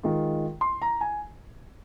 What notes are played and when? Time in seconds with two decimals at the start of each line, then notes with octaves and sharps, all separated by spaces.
0.03 D#3 G#3 F4
0.61 C6
0.82 A#5
1.01 G#5